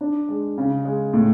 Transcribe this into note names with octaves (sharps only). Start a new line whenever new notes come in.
D4
G#3
C#3
G#3
A2